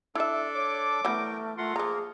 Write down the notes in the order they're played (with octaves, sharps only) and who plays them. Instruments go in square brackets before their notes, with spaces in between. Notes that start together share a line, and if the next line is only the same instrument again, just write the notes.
[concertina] D4 A4 D5 [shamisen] E4 E5
[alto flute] C#5 [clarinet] D6
[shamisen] E3 G3 B3 [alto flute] A3 [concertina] A#4 G5
[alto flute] A3 [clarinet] F4 [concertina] A#4 F#5 C6
[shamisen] F3 A#5 [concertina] A#3 A#4 [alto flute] G#4